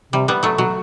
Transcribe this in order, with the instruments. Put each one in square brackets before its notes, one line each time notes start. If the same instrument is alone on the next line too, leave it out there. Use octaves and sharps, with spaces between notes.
[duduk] C3 [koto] G3
[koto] G3 B3
F#3 A3
[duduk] B2 [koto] F#3